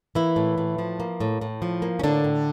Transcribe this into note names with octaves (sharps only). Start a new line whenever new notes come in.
E3 A#3 E4
A2
A2
F3
A#3
A2
A2
F3
A#3
C#4
A2 D3 D4
A2